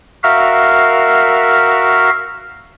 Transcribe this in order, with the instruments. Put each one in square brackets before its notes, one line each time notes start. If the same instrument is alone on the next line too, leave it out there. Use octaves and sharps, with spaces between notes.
[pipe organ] F#4 A#4 E5 F5